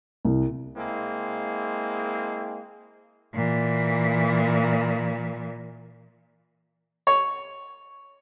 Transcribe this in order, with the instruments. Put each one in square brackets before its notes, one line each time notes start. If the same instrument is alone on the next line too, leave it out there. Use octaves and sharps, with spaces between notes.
[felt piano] C2
[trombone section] G#3 A#3 C4 E4 G#4
[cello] A#2 E3
[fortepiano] C#5